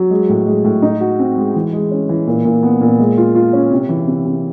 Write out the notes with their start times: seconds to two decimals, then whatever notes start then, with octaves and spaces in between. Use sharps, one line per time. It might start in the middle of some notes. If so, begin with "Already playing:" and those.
Already playing: F#3
0.11 G#3
0.29 A2
0.47 G#3
0.64 A2
0.82 D#4
1.01 F#4
1.19 C4
1.37 G#3
1.55 E3
1.73 G#3
1.91 C#4
2.09 E3
2.27 A#2
2.45 A#2
2.63 B3
2.81 A#2
2.99 G#3
3.18 F4
3.35 F4
3.53 C#4
3.71 C3
3.89 E3
4.07 C3
4.25 C3